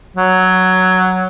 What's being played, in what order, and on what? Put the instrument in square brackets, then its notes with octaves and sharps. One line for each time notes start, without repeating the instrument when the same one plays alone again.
[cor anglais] F#3